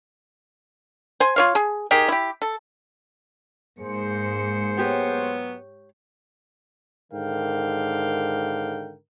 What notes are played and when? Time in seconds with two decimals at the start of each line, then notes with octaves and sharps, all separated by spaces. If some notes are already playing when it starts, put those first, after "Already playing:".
1.20 C5 G#5
1.36 F4 C#5 F5
1.55 G#4
1.91 D#3 G4 G#4
2.08 E4 G4
2.42 A4
3.79 G#2 A#3 G#4 C5 C#7
4.78 F#3 B3 G4 C#5
7.12 G#2 D3 D#3 A#4 F5 G5